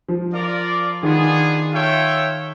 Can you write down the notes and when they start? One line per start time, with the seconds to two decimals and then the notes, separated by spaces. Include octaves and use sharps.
0.09 F3
0.33 F4 A#4 D5
1.03 D#3 B3 D4 F4 G#4
1.72 F4 A4 C#5 E5 G5